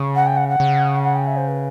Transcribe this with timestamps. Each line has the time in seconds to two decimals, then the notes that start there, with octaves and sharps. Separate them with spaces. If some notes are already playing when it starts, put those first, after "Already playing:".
Already playing: C#3
0.15 F#5
0.27 G5
0.37 F#5
0.49 F#5
0.60 C#3
1.04 F#5
1.15 G5
1.27 E5
1.37 C5
1.48 B4